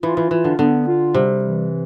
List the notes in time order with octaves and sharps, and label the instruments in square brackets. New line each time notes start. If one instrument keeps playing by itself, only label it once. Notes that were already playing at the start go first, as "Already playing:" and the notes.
[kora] E3 [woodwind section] F4
[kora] E3
[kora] E3 [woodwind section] F4
[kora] D3
[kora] D3 [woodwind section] B3
[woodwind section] F4
[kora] C3 [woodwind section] G3
[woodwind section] E3